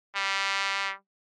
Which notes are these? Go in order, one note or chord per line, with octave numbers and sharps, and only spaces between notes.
G3